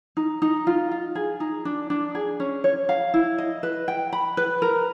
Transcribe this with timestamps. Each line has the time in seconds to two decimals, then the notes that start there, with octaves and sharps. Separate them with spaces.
0.17 D#4
0.42 D#4
0.67 F4
0.91 F4
1.15 G#4
1.40 D#4
1.65 D4
1.90 D4
2.15 G#4
2.40 C#4
2.64 C#5
2.89 F5
3.14 E4
3.38 D#5
3.63 B4
3.88 G5
4.12 B5
4.37 B4
4.62 A#4